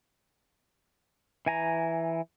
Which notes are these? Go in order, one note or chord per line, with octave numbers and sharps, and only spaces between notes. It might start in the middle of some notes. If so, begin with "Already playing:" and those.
E3 G#5 A#5